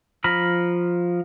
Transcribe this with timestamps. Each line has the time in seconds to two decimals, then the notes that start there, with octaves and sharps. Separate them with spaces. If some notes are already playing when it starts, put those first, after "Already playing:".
0.24 F3 A#5 B5 F6